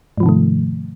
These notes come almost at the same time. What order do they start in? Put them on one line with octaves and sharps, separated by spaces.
G#2 F3 C3 D#3 A3